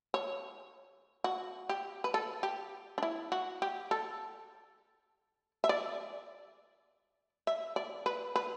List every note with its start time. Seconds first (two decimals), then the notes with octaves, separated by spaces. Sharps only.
0.14 C#5
1.24 F#4
1.69 G4
2.04 B4
2.14 A4
2.43 G4
2.98 D4
3.03 E4
3.32 F#4
3.62 G4
3.91 A4
5.64 E5
5.69 D5
7.47 E5
7.76 D5
8.06 B4
8.35 B4